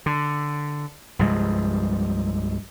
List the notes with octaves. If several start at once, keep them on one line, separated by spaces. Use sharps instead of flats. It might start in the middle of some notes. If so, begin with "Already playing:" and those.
D3
C2 G2 F3 G#3